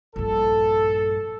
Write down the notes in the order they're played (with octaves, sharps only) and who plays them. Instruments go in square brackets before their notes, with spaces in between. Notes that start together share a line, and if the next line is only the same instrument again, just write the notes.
[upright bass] A#1 G2 [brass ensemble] A4